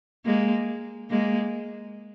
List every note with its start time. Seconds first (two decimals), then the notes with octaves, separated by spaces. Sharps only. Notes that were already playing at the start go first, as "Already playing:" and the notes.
0.26 G#3 A#3
1.10 G#3 A#3